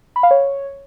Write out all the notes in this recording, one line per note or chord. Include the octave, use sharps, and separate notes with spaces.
B5
F5
C#5